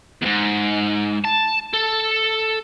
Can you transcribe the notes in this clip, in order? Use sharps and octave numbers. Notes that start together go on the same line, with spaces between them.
E2 G#2
A5
A4